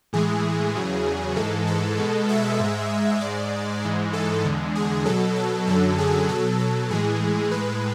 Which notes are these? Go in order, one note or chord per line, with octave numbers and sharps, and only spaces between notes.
A2 E3 G#3 G#4
E2 C#3 F#3
G#2 E3 G#3 A4
A4
B2 G#3
E5
G#2 G#3
G#2 G#3 D5
G#2 E3 G#3
A4
E2 D3 G#3
G#4
B2 F#3 A4
A4
F#2 D3 F#3 A4
G#4
B2 F#3 A4
A4
A2 E3 G#3 G#4
A2 G#3 B4